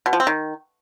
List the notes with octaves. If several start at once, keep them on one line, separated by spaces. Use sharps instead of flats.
B2
F3
C4
D#3